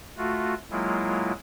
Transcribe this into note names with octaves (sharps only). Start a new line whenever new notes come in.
A3 F4 F#4
F#3 G#3 A#3 E4 F4